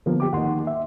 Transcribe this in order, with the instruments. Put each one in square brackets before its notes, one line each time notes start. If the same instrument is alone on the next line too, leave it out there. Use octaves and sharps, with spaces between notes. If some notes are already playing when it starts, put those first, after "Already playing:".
[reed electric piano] D3 F3 B3 [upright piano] A#3
[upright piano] G4 D6
[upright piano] D#2 D#4 [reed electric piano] F#5 C6
[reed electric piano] E5